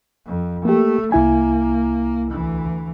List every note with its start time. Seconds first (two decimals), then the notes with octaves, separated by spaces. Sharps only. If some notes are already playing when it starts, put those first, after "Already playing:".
0.27 F2
0.65 A3 A#3 G4
1.12 C2 A#3 E4 G#5
2.31 D2 E3